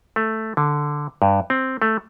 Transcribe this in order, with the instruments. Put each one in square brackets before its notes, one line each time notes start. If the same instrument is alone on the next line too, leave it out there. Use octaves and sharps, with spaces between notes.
[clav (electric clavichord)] A3
D3
G2
C4
A3